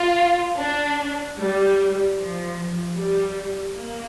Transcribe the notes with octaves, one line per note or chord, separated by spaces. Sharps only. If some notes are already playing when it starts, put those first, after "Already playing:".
Already playing: F4
D4
G3
F3
G3
A#3